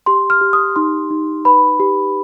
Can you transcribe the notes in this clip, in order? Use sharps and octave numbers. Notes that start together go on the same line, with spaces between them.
G4 C6
F6
G4
D#6
D#4 C6
D#4
B4 B5
G4